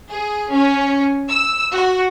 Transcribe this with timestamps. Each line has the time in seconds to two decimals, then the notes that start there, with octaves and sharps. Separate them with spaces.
0.11 G#4
0.52 C#4
1.30 E6
1.73 F#4